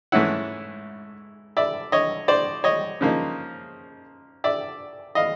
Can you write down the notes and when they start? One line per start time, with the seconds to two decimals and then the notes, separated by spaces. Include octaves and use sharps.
0.12 G#2 E3 A3 C#4 E4 E5 F#5
1.57 D5 E5
1.92 C#5 D#5
2.28 C5 D5
2.64 C#5 D#5
3.01 C#3 F3 A#3 D#4
4.44 D5 E5
5.15 D#5 F5